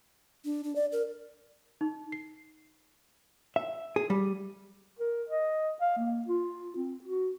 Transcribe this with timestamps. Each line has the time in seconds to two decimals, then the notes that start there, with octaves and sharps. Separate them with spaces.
0.45 D4
0.64 D4
0.76 D5
0.92 A#4
1.81 D#4
2.12 C7
3.56 E5
3.96 G#4
4.10 G3
4.99 A#4
5.29 D#5
5.81 F5
5.97 A#3
6.28 F4
6.76 C4
7.04 F#4